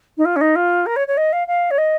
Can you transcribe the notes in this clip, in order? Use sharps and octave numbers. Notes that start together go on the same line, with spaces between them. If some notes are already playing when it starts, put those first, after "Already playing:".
D#4
F4
C#4
D#4
F4
A#4
C#5
C#5
D#5
F5
F5
C#5
D#5